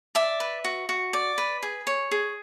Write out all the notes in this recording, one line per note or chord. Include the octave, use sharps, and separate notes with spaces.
D5 E5
B4
F#4
F#4
D5
B4
G#4
C#5
G#4